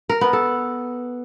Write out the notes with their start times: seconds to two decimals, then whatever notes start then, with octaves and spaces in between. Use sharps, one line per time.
0.09 A#4
0.21 B3
0.33 A4